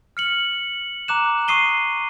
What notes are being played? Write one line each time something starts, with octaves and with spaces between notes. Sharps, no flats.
F6 C#7 F#7
A#5 D6 F#6 E7
C#6 D#6 C7 D#7 G7